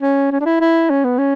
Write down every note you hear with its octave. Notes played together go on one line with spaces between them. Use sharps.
C#4
C#4
D4
E4
E4
C#4
B3
C#4